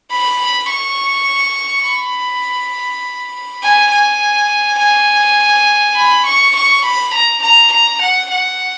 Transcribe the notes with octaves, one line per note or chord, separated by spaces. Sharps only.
B5
C#6
B5
G#5
G#5
G#5
B5
C#6
C#6
B5
A#5
A#5
A#5
F#5
F#5